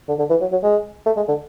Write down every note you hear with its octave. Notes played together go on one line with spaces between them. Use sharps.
D3
D3
E3
F#3
F#3
G#3
A3
G#3
D3